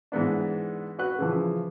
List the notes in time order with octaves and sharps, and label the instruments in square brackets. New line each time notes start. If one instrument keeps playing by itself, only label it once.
[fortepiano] G#2 E3 B3 D4
F#4 B4 F#6
C#3 E3 F3